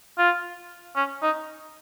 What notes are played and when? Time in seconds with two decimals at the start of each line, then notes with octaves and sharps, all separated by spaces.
0.18 F4
0.96 C#4
1.22 D#4